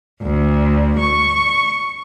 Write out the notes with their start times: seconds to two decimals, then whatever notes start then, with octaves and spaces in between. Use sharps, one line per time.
0.24 D2
0.99 C#6